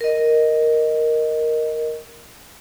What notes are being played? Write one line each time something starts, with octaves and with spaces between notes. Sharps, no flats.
A#4 D#5